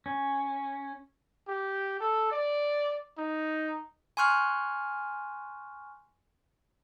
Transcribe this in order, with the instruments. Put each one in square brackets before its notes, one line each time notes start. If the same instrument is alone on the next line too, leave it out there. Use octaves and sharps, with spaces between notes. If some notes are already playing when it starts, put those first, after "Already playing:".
[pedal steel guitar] C#4
[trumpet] G4
A4
D5
D#4
[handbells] G#5 C6 C#6 F6 F#6